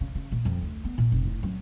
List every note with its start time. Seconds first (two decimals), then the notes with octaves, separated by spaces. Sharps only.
0.01 C#3
0.15 C#3
0.32 A#2
0.45 F2
0.62 D2
0.85 B3
0.98 A#2
1.12 F1
1.25 A2
1.43 F#2